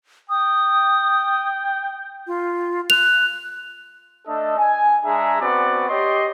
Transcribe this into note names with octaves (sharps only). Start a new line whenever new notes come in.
G5 D#6
F4
F#6 F7
A3 D4 A4 D#5
G#5
G#3 D4 G#4 E5 A#5
B3 C4 F#4 D5 F#5
G4 C#5 D#5 C6